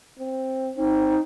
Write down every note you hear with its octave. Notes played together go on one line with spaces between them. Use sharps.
C4
C4 D#4